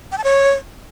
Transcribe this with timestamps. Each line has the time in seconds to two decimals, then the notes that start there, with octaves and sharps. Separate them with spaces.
0.12 G5
0.18 A5
0.24 C#5